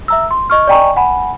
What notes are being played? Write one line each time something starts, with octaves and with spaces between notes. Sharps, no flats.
E5 A#5 E6
C6
D#5 C#6 F6
D5 D#5 G5 G#5 A#5 C#6
F#5 G#5 B5